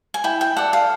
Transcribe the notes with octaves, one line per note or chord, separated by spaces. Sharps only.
G#5
E4 G5
G5
A4 D5 F#5
F5